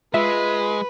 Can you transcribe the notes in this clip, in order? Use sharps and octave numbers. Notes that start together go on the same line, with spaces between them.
G#3 F4 B4 E5 B6